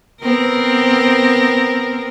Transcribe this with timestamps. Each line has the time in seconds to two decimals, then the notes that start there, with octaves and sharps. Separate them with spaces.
0.21 B3 C4 A#4